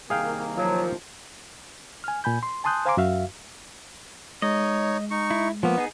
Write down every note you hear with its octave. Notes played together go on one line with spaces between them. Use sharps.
C2 D#3 A#3 G#4 F5 G5
F3 F#3
G#5 F6
A#2 G#5 B5 G6
C6
G#5 A5 C6 D#6 F#6 G6
C5 F5 G#5 A#5 C6 D6
F#2 F#4 E5 F5
G#3 D#4 C#5 D#5
D#4 C#6
E4
F3 A#3 B3
D#4 G#4